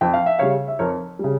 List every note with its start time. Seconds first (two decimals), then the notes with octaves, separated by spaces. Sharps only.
0.01 F2 G5
0.13 F5
0.26 E5
0.39 C#3 G3 C#5 F5
0.68 E5
0.79 F2 A#4 C#5
1.19 C#3 G3